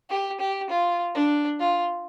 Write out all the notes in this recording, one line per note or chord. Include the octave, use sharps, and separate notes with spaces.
G4
G4
F4
D4
F4